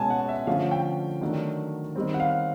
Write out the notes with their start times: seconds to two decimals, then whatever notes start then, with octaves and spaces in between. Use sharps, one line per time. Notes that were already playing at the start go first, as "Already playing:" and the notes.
Already playing: B2 G#3 C#4 G#5 A5
0.10 F#5
0.29 E5
0.47 D3 F3 A3 C#4 F5
0.71 G5
1.21 D#3 F#3 A3 D4
1.96 D#3 G3 C4
2.14 F#5
2.20 F5